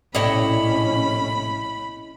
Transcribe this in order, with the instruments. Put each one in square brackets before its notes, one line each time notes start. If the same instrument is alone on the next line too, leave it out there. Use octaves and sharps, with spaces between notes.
[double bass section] A#1 C#4 [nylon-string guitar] A2 C3 [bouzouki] E4 C#5 D#5 [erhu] B5